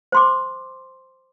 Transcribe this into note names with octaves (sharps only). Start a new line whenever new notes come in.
C5 C6 D6